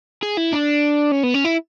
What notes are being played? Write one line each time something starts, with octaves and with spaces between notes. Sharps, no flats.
G#4
E4
D4
C#4
B3
C#4
E4